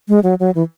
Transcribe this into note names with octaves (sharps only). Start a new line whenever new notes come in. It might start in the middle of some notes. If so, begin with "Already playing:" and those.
G#3
F#3
F#3
E3